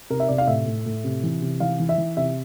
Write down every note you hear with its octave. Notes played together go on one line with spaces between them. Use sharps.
C3 A#4
E5
C3 D5
F5
A2 E5
A2
A2
C3
E3
C3
E3 F5
E3
E5
E3
C3 E5